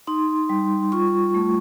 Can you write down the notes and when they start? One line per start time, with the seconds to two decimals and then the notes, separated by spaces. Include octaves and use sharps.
0.07 D#4 C6
0.49 G3
0.92 F4 C#6
1.34 A3